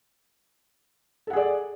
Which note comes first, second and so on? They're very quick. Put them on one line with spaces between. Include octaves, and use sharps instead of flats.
A4 F#5 G#4 D5